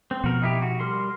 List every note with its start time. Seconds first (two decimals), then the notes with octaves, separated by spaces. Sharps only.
0.11 C4
0.24 B2 F3 B3 F#4 A#4
0.42 D#4 E4 G4
0.62 F#4
0.80 G3 A#4 C6